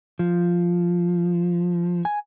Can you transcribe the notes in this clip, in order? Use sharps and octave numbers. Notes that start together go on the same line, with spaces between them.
F3
G#5